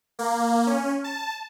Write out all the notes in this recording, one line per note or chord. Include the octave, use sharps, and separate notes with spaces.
A#3
C#4
A5